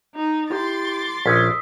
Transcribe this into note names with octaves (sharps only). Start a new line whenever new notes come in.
D#4
E4 G4 C6 D6 G6 A6
A#1 C#4 D#6 E6 B6